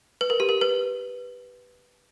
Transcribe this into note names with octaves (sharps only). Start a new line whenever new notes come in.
B4
A#4
G4
A#4
B4